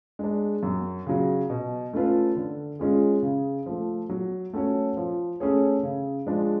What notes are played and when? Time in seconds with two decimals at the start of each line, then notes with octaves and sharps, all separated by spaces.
0.19 G#3 D4
0.63 F#2
1.07 C#3 F#3
1.50 B2
1.93 A3 C#4 F4 B4
2.36 D3
2.79 G#3 C#4 F4 G#4
3.22 C#3
3.66 F3 A3
4.09 F#3
4.53 A3 C#4 F#4 C#5
4.97 F3
5.40 A3 C#4 G#4 C#5
5.83 C#3
6.26 F3 G#3 D4